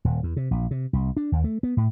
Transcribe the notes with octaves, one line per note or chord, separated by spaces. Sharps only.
D#1
E2
C3
A#1
C3
C2
D4
D#2
A3
B3
A2